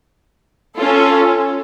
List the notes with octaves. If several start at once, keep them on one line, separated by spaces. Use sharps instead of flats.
C#4 F4 A4